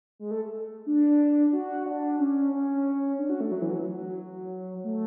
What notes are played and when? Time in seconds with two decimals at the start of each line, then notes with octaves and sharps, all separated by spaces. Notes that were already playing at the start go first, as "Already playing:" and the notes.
0.19 G#3
0.31 A3
0.86 D4
1.53 F#4
1.86 D4
2.19 C#4
2.52 C#4
3.19 D4
3.30 F#4
3.40 A3
3.52 F#3
3.62 E3
3.71 F#3
3.85 F#3
4.84 A3